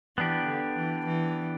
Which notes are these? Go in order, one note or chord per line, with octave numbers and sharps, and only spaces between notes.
E3 B3 D4 G4
D3
E3
E3